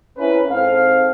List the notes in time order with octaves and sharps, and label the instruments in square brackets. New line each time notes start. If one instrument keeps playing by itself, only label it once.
[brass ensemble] C4 C#4 E4 A#4 B4
G#2 C4 A4 F5